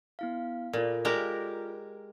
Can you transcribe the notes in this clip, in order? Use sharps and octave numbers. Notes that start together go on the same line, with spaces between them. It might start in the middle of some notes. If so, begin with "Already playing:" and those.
B3 E4 F5
A#2 F4 A4 D5
G#3 G4 A#4